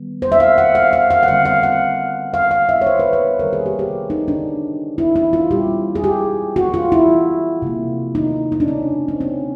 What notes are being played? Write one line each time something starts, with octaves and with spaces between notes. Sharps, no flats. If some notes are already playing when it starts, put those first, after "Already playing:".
Already playing: D#3 G3 B3
C5
E5
F5
F#5
F5
F5
F5
F#5
D3 G3 C4 F5
F5
F#5
F5
F5
E5
C#5
C5
B4
B4
C3 D#3 G3 A#4
G#4
G4
G4
D#4
D4
E4
E4
F4
A#2 G3 C4 G4
G#4
G4
F#4
F4
E4
C3 F3 A#3
D#4
D#4
D4
C#4
C4
C#4